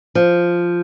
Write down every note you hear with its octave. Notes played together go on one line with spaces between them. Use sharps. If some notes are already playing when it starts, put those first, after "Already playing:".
F3